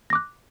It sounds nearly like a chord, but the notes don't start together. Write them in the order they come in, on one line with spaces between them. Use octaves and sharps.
A#6 D6 F#6